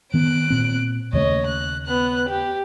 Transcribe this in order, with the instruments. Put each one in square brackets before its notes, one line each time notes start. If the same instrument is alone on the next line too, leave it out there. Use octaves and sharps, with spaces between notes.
[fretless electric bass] D#3 B3 [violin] F#6 D7
[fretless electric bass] A#2 C4
[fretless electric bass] D#2 C#3 A3 [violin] C#5 D#5
[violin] F#6
B3 F#6
G4